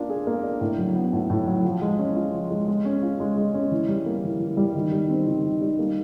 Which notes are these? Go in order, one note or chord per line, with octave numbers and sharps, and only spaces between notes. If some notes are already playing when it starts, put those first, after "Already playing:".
Already playing: A#3 D4 F4
G#4
A#3
D4
A2
F#3
B3
A2
A2
F#3
F3
G#3
C#4
F4
F3
G#3
G#3
C#4
F4
G#3
G#3
C#4
E3
G3
A#3
E3
E3
G3
D#3
G3
C4
D#3
D#3
G3
A#3